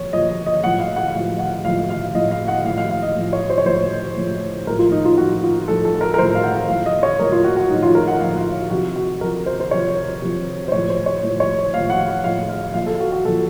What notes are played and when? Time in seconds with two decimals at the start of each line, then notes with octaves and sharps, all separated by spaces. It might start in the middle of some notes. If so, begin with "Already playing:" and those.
Already playing: A#2 F3 C#5
0.13 A#2 F3 D#5
0.46 D#5
0.64 A2 F3 F#5
0.80 F5
0.96 F#5
1.14 A2 F3 F5
1.39 F#5
1.64 A2 F3 F5
1.90 F5
2.15 A2 F3 D#5
2.31 F5
2.48 F#5
2.64 A2 F3 F5
2.78 F5
2.90 F5
3.02 D#5
3.15 A2 F3
3.33 C#5
3.50 C5
3.58 C#5
3.66 A2 F3 C5
4.16 A2 F3
4.67 A2 F3 A#4
4.79 F4
4.92 D#4
5.05 F4
5.18 A2 F3 F#4
5.43 F4
5.68 A2 F3 A4
5.85 A4
6.01 A#4
6.14 A#4
6.18 A2 F3 C5
6.35 F5
6.43 F#5
6.56 F5
6.69 A2 F3 F5
6.86 D#5
7.03 C#5
7.19 A2 F3 A#4
7.32 F4
7.44 F#4
7.57 F#4
7.70 A2 F3 D#4
7.82 F4
7.95 A#4
8.07 F#5
8.20 A2 F3 F5
8.38 F5
8.70 C3 F3 F#4
8.96 F#4
9.21 C3 F3 A#4
9.46 C5
9.60 C5
9.71 C3 F3 C#5
10.22 C3 F3
10.68 C5
10.72 A2 F3 C#5
10.89 C5
11.06 C#5
11.23 A2 F3
11.40 C#5
11.73 A2 F3 F5
11.90 F#5
12.08 F#5
12.24 A2 F3 F5
12.49 F5
12.74 A#2 F3 F5
12.86 A4
13.00 F#4
13.12 F#4
13.25 A#2 F3 A4